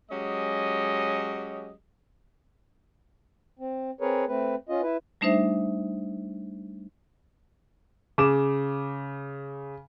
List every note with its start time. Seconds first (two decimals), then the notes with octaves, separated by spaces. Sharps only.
0.10 F#3 G#3 C#4 G4 D#5
3.59 C4
4.01 C4 G#4 A#4 B4 C#5
4.28 A3 C4 B4
4.69 C#4 F4 D#5
4.82 E4 B4
5.21 G3 A3 D4 D#4 C5 E5
8.18 C#3 D6 E7